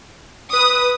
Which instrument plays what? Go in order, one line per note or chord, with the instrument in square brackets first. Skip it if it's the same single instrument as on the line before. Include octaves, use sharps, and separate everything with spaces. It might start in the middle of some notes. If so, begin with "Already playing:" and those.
[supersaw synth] B4 [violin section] D#6